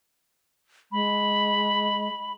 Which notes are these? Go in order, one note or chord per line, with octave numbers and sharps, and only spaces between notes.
G#3 B5